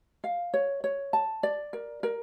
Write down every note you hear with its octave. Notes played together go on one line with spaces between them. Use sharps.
F5
C#5
C#5
A5
D5
A#4
A#4